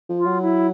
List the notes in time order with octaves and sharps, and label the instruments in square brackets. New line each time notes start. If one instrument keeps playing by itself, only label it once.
[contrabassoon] F3
[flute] F4
[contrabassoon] F#3
[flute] E4